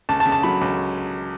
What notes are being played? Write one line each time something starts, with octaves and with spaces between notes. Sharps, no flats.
C#2 A5
A5
C#3
A5
F#3 B5
C#2